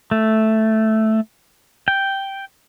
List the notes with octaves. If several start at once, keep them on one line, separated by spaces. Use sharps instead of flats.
A3
G5